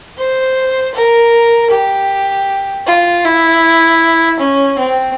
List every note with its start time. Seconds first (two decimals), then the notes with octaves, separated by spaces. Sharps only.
0.18 C5
0.95 A#4
1.72 G4
2.87 F4
3.25 E4
4.40 C#4
4.79 C4